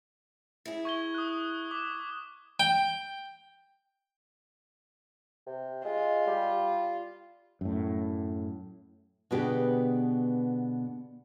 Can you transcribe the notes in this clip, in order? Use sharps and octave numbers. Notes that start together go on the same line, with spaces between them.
E4 G#4
C#6 G#6 G7
D#6 F#6
D6
G5
C3
G#3 F4
G3
F#2 A2
B2 D3 B3 G4 G#4 B4